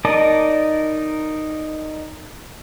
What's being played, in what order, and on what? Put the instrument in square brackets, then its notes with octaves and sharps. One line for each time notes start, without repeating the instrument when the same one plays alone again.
[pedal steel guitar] D#4 A#4 D5 D#5 A5